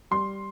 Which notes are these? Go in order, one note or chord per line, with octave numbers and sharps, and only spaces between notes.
G3 C6